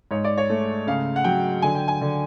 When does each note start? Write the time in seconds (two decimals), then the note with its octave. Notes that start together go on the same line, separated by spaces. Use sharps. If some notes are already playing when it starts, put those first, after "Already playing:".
0.11 G#2 C#5
0.24 D5
0.38 C#5
0.50 A3
0.87 C#3 F5
1.16 F#5
1.24 F#3 G5
1.62 D3 G#5
1.75 G5
1.88 G#5
2.01 D3